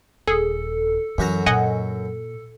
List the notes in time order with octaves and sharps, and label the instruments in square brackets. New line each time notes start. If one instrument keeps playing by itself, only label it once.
[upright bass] D#1 [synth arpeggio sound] G#4 [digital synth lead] A4
[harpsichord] F#2 F#4 A#5 [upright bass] E3
[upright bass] A#2 [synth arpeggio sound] D#5 F#5 G#5